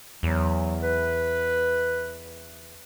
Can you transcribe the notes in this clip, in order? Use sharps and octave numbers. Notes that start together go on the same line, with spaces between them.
E2 F#3
B4